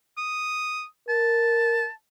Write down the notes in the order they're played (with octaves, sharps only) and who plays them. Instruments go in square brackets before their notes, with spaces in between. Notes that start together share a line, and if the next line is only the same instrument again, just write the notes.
[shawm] D#6
[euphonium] A#4 [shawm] A5